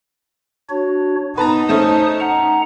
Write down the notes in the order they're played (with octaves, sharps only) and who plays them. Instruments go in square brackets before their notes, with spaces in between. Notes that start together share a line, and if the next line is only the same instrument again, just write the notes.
[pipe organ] D4 F#4 C#5
[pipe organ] B3 [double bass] D#4 [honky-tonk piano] B4 A5 A#5
[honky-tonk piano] A3 C#4 [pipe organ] C5 A5 D#6
[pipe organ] F#5 A#5